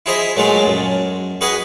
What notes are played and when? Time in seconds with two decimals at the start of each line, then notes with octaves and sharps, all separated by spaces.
0.06 E4 F4 G#4 C5 D#5 E5
0.36 A#2 F#3 G#3 A3 F4
0.66 F#2
1.41 F#4 G#4 B4 D#5 F#5 G#5